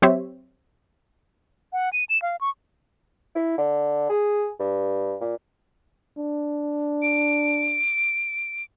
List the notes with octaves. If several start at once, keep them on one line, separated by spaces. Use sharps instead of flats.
F#3 C4 G4 C5 C#5 E5
F#5
D#7
E7
F5
C#6
E4
D3
G#4
G2
A#2
D4
D7